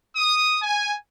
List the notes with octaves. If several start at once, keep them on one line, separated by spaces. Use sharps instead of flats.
D#6
G#5